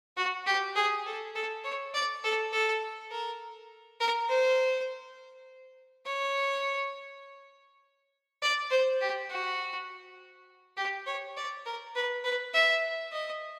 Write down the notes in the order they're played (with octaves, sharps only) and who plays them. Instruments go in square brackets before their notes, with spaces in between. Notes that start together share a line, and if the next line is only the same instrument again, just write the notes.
[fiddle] F#4
G4
G#4
A4
A4
C#5
D5
A4
A4
A#4
A#4
C5
C#5
D5
C5
G4
F#4
G4
C#5
D5
A#4
B4
B4
E5
D#5